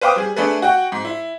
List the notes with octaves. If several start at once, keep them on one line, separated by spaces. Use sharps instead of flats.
B4 C5 F5 G5 D6 D#6
G3 G#4
A3 D4 G#4 A4 B4
F#4 F#5 G5
G#2
E4